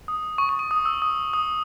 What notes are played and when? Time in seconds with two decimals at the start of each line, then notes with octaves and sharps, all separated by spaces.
0.08 D#6
0.38 C#6
0.49 C#6
0.59 C#6
0.71 D#6
0.85 E6
1.02 D#6
1.33 D#6